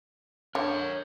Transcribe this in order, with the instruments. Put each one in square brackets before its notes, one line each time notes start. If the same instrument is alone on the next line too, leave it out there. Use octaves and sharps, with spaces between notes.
[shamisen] D3 [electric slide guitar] A#4 C#5